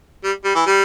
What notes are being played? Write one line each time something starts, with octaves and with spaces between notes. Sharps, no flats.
G3
G3
E3
G3